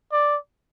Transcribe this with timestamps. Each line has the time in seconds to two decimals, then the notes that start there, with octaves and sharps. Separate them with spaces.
0.12 D5